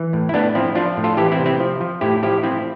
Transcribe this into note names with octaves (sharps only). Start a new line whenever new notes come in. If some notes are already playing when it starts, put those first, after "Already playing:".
Already playing: E3
A2
E4
A2 B3 D4
F3 C4 E4
F3 D4 F4
A2
F4 A4
E3 E4 G4
C4 E4
C3
C4 E4
F3
F3
A2 E4 G4
F3 E4 G4
F3 C4 E4